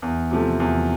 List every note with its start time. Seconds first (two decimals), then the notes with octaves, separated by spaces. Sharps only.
0.02 E2
0.31 C3 F3 A3
0.60 E2